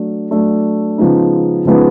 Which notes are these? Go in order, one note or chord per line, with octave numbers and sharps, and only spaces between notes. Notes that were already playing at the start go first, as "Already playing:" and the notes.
Already playing: F#3 A3 D4
F#3 A3 D4
C#3 F3 G#3 B3 D#4
C#3 F3 G#3 B3 D#4